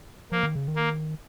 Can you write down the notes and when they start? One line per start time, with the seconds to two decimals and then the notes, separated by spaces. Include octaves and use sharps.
0.32 F3 A#3
0.43 D#3
0.55 C#3
0.68 D#3
0.76 A#3